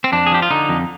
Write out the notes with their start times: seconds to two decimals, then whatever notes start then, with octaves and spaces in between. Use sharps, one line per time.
0.04 C4
0.12 F2 D4
0.26 G#4
0.32 F3 G4
0.42 F4
0.51 D3 D#4
0.69 F2